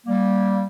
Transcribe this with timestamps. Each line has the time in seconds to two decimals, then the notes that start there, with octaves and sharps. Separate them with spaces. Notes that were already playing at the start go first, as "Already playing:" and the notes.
0.07 G3 A#3